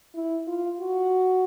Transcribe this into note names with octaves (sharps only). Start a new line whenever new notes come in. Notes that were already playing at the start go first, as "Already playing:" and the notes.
E4
F4
F#4